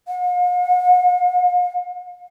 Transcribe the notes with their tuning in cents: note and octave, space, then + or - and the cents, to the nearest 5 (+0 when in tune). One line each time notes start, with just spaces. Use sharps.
F5 +45